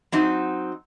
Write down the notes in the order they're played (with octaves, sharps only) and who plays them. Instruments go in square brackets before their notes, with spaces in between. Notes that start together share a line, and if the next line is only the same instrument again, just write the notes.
[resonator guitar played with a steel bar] F#3 C4 D#4